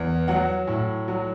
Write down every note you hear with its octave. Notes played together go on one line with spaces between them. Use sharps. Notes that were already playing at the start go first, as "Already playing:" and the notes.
Already playing: E2
F#3 F#5
A2
F#3